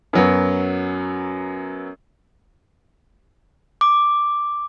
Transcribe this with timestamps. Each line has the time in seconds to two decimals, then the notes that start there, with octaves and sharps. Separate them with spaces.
0.13 F#2 F#3 B3
3.81 D6